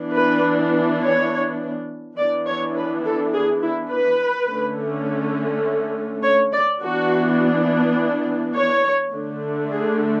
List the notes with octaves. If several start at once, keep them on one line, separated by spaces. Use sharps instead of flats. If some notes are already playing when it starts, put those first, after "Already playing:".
Already playing: E3 B3 D4
B4
C#5
E3 B3 D4 D5
C#5
B4
A4
G#4
E4
B4
D3 A3 C#4
C#5
D5
E3 B3 D4 F#4
C#5
D3 A3 D4
G#4